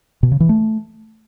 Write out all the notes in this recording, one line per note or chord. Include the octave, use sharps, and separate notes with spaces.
B2
C#3
E3
A3